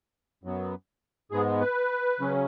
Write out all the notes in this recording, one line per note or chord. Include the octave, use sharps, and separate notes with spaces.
F#2 F#3 B3
G#2 G#3 B3 G#4
B4
C#3 F#3 C#4